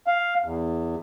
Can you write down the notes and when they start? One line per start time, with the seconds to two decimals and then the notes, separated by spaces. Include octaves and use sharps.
0.07 F5
0.44 E2